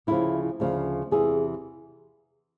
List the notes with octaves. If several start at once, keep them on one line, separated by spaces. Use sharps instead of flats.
D2 C#3 F3 E4
D2 C#3 F3
E2 C3 E3 G#4